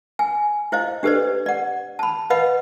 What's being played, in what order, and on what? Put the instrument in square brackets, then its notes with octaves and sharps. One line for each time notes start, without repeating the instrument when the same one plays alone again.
[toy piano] G#5
E4 C5 D#5 F5
D4 G4 A4 B4 C5 D5
D5 F#5
A5 B5
B4 D#5 F5 F#5 B5